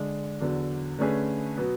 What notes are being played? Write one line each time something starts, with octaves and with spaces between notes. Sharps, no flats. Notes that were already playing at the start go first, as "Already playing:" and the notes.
Already playing: D3 G#3 D4
E2 D3 F#3
D3 A3 C#4 G#4 B4
B2 F#3 B3